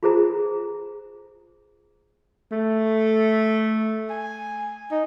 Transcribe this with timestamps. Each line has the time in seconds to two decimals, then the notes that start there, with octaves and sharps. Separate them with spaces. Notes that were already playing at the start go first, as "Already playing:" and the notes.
0.03 F4 G#4 A4 C5 A#5
2.52 A3
4.10 G#5
4.91 D#4